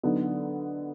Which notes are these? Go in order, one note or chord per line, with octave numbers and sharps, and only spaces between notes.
D3 F#3 B3 D#4